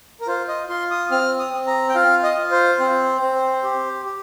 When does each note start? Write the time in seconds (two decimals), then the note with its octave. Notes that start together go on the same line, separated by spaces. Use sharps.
0.21 A#4
0.27 F4 C5
0.48 D#5
0.69 F4 C6
0.91 D#6
1.11 C4 F6
1.39 D#6
1.53 C4
1.67 A#5
1.89 G5
1.95 F4 F5
2.23 D#5
2.37 F4
2.51 C5
2.79 C4
3.21 C4
3.63 G4
4.05 G4